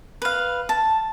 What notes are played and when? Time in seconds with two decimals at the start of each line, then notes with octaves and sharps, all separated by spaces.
0.22 B4 F5
0.69 A5